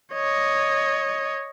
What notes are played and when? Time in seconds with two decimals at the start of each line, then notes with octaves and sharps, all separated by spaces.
0.14 C#5 D#5